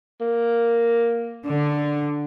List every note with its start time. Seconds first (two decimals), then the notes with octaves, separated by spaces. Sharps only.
0.20 A#3
1.46 D3